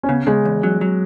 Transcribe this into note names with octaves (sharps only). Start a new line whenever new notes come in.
C#4
C#3 B3
C#3 G#3
E2
F#3
F#3